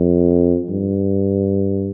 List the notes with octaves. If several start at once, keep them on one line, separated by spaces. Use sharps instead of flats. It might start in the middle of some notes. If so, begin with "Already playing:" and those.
Already playing: F2
G2